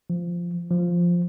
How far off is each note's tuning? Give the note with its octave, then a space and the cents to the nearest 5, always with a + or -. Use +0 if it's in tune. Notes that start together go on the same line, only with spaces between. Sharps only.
F3 -15
F3 +0